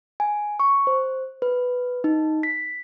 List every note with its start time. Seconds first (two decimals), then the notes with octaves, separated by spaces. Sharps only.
0.20 G#5
0.60 C#6
0.87 C5
1.42 B4
2.04 D#4
2.43 B6